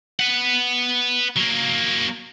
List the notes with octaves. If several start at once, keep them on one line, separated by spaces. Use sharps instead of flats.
B4 F#5
F#3 A#3